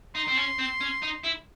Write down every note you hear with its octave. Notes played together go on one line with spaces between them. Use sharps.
D#4 C6
C4
C#4
C4
C#4
D#4
E4